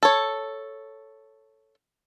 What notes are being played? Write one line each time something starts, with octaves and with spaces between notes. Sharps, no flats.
A4 C#5